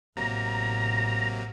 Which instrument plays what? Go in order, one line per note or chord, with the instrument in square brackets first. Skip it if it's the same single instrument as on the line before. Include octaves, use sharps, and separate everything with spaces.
[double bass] A1 [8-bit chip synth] C3 F#3 A#3 [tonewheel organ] A#5